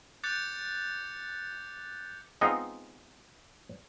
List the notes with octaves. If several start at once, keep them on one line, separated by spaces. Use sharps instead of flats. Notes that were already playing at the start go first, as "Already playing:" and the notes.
D6 F#6 G6 A6 C#7
G#3 B3 C4 D#4 F4